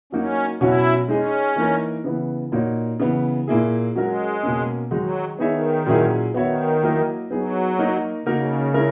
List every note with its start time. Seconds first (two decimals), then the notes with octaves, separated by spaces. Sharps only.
0.12 F#3 A#3 C#4 D#4 F#4
0.61 B2 F#3 C#4 E4 F#4 C#5
1.08 G#3 C#4 D#4 G#4 D#5
1.56 E3 A#3 D#4 A#4
2.04 C#3 E3 B3
2.52 A#2 A#3 D#4 F#4 C#5
2.99 C#3 E3 B3
3.48 A#2 A#3 E4 G#4
3.95 F#3 G#3 C#4 F#4 A#4
4.43 B2 A#3 C#4
4.91 D#3 F#3 G#3 D#4 F#4
5.39 D#3 B3 D#4 G#4 C#5 E5
5.86 A#2 F#3 C#4 E4 G#4
6.34 D#3 B3 F#4 C#5 E5
6.83 F#3 A#3 E4 A#4 D#5
7.30 F#3 B3 D#4 G#4
7.78 A#3 D#4 A#4 D#5
8.26 C#3 A#3 D#4 F#4 A#4
8.74 G#3 C#4 E4 A#4